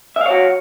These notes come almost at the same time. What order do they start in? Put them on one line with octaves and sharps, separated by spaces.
E5 F5 C#5 F#4